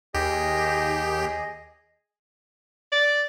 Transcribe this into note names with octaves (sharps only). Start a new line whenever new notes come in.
D#2 G4 G#4 D#5
D5